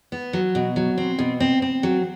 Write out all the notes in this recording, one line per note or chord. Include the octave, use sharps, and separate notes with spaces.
B3
F#3
B2
F#3
C4
B2
C4
C4
F#3